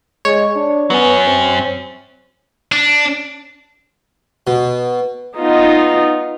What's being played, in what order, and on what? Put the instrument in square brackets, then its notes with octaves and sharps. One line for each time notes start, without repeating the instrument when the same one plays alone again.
[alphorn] G#3 [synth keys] C#5
[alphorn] D4
[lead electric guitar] F#3 C#4 [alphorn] B3
[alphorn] C4
[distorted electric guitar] D4
[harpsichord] B2
[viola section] B3 D#4 F4